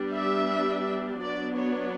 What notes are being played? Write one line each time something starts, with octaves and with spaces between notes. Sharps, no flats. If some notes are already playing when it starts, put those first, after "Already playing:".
Already playing: G3 B3 D4
E5
F#3 B3 D4 D5
C#5